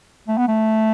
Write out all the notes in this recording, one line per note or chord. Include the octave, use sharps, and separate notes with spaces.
A3
B3
A3